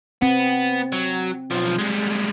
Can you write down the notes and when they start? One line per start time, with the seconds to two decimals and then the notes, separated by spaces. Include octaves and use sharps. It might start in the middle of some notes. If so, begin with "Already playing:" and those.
0.22 B3 C4
0.92 F#3
1.51 B1 F3
1.78 G3 G#3